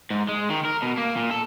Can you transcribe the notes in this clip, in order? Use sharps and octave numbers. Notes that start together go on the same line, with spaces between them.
G#2
G#3
D#3
A#4
B2
A#3
A#2
A4